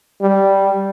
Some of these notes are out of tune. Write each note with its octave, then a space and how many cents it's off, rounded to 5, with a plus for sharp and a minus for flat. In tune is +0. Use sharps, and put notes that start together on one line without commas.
G3 -5